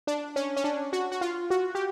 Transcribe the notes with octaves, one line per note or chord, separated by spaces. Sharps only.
D4
C#4
C#4
D4
F#4
F#4
F4
F#4
G4